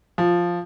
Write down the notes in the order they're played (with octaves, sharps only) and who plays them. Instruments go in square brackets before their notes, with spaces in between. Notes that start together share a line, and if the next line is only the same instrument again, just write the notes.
[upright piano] F3